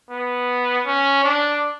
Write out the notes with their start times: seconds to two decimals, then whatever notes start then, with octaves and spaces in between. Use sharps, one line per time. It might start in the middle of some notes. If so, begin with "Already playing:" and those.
0.11 B3
0.86 C#4
1.24 D4